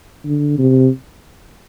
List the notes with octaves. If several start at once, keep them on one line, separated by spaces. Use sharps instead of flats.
D3
C3